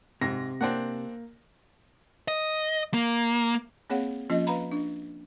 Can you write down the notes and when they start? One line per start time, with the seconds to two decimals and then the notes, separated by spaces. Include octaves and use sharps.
0.21 G#2 C3 A#6
0.61 A#3 C4 D4 F#5
2.28 D#5
2.94 A#3
3.90 A#3 C4 G#4 C#5 F5 F#5
4.30 F3 A#3 C#4 F4 D#5
4.47 B4 F5 A#5 B5
4.72 D4